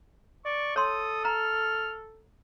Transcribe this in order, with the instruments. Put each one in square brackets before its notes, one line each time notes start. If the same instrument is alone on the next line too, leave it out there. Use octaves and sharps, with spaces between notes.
[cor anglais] D5 [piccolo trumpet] C#6
[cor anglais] A4 [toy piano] C#5 C6 [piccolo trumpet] D#6
[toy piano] A#5 [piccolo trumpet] F6